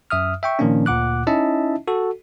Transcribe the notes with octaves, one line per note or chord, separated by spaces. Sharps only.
F#2 E5 D#6 F6
E5 G5 C#6
A#2 D#3 F3 A#3 C#4 D4
D2 A#2 F#5 D6 F#6
C#4 D#4 E4 D#5 E5 A5
F#4 A4